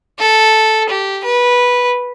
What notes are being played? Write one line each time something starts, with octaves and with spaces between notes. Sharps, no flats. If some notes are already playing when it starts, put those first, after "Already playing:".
A4
G4
B4